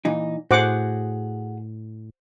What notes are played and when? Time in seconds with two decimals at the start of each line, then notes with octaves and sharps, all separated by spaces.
0.05 A#2 E3 D#4
0.51 A2 F#4 G#4 C5 F#5 D6